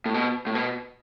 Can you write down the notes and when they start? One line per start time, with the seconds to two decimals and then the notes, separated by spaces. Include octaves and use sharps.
0.06 A2
0.14 B2
0.47 A2
0.55 B2